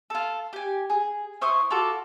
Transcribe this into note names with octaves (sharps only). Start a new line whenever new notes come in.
F4 A4
G4 G#5
G#4
E4 C5 C#6 D#6
F4 F#4 A4 D6